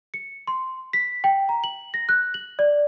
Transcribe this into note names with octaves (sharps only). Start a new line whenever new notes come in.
C#7
C6
B6
G5
A#5
F#7
A#6
F#6
F#7
D5